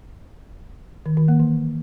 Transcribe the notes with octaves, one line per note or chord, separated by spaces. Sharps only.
D#3
D#3
A#3
E3